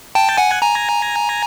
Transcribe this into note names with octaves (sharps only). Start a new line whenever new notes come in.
G5 A5
F#5 G#5
G#5 A#5